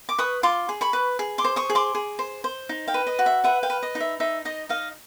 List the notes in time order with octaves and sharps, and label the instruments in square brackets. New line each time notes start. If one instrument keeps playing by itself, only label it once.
[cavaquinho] D6
B4 C#6 D#6
F4 C6 D6
G#4
B5 C#6
B4
G#4
C6 D6
C5
C#6 D#6
G#4
C6 D6
G#4
C5
C5
D#4
F5 G5
B4
D#5
F#4
E5
B4 E5 F#5
F5 G5
B4
D#5
D#4
E5
D#4 E5
D#4 D#5
D#4 D#5 F5